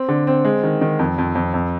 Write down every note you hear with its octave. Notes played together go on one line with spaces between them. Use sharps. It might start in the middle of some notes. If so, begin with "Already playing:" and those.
Already playing: C4
D3
C4
G#3
D#3
D#3
F2
F2
F2
F2